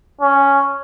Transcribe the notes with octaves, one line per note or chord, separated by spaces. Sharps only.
C#4